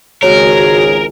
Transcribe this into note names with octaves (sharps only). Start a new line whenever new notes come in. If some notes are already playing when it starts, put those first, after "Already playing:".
G#1 C#2 F#4 G#4 A#4 C#5